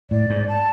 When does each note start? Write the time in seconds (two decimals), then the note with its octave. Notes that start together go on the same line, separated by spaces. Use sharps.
0.11 A2 D5
0.30 G#2
0.48 A5